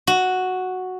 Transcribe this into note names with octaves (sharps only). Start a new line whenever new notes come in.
F#4